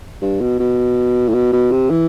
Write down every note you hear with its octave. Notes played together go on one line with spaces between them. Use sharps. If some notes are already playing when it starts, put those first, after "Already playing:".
G2
B2
B2
A2
B2
B2
C3
E3